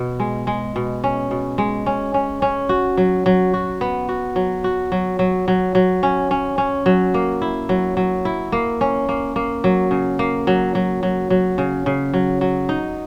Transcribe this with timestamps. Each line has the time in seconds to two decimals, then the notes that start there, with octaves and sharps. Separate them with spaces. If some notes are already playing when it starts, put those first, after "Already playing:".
Already playing: B2
0.20 G#3
0.47 G#3
0.76 B2
1.04 C#4
1.31 B2
1.58 G#3
1.86 C#4
2.14 C#4
2.42 C#4
2.69 F#4
2.97 F#3
3.26 F#3
3.54 F#4
3.81 B3
4.09 F#4
4.36 F#3
4.64 F#4
4.92 F#3
5.19 F#3
5.48 F#3
5.75 F#3
6.03 C#4
6.31 C#4
6.58 C#4
6.86 F#3
7.14 A#3
7.42 E4
7.69 F#3
7.97 F#3
8.25 E4
8.52 A#3
8.81 C#4
9.09 A#3
9.36 A#3
9.64 F#3
9.91 C#3
10.19 A#3
10.47 F#3
10.75 F#3
11.03 F#3
11.30 F#3
11.58 C#3
11.86 C#3
12.14 F#3
12.41 F#3
12.69 D#4